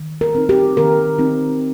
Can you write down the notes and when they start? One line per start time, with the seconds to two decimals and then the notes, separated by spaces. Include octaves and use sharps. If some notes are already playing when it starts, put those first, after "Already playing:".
Already playing: D#3
0.21 A#4
0.35 C4 D#4
0.49 G4
0.77 D#3 A#4
1.19 C4 D#4